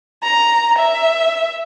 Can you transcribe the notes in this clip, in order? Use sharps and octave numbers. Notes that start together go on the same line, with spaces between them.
A#5
E5